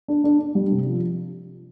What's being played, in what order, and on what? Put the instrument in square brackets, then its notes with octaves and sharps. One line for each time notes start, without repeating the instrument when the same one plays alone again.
[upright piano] D4
D4
D4
G3
C3
F3